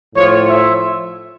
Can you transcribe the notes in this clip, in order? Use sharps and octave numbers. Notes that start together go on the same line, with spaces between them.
A2 F3 C#5
E5